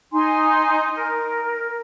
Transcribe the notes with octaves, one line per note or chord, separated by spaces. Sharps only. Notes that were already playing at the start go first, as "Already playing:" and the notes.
D#4 G#5 C6
A#4